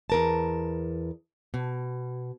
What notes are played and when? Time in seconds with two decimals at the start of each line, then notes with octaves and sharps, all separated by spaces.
0.10 E2 A#4 A5
1.54 B2